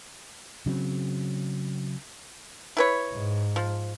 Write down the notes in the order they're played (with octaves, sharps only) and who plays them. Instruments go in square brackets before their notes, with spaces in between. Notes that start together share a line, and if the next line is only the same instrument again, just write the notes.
[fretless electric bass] C#3 F#3 C4
[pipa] E4 B4 C#5
[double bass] G#2
[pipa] F3